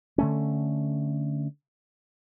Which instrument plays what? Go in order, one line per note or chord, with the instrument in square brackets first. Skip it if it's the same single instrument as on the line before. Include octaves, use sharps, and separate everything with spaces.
[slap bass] D3 A3 C#4